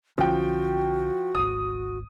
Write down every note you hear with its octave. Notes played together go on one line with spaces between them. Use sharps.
B1 D3 F3 C#4 F#4 G5
D1 G#1 G#2 D#6